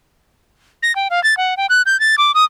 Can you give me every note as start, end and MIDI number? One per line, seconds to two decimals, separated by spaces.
0.83 0.95 94
0.96 1.08 79
1.10 1.22 77
1.24 1.37 93
1.37 1.57 78
1.57 1.66 79
1.70 1.82 90
1.86 1.99 91
2.00 2.16 93
2.18 2.34 86
2.34 2.45 87